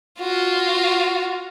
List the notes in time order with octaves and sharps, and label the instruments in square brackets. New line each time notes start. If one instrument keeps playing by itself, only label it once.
[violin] F4 F#4